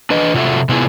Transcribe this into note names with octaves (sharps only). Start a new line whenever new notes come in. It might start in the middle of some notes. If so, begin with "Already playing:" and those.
D4 B4 D#5
C3 F4 F#4 A4 E5
C3 B3 E4 F4 G#4